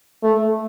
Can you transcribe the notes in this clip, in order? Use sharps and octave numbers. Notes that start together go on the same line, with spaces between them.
A3